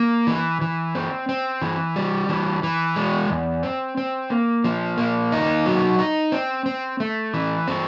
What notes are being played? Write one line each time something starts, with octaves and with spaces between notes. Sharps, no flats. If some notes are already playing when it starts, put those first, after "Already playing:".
Already playing: A#3
E3
E3
C4
C4
E3
G3
E3
E3
G#3
E2
C4
C4
A#3
F3
A#3
D#4
F#3
D#4
C4
C4
A3
E3
C4